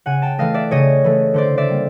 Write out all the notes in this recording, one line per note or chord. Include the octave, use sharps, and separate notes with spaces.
C#3 F#5 G#5
G5 A5
E3 A3 D#5 F5
D5 E5
C#3 C#5 D#5
E3 A3
D3 C5 D5
D5 E5
G3 A#3